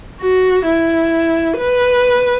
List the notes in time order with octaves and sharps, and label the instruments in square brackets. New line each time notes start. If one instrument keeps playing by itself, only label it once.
[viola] F#4
E4
B4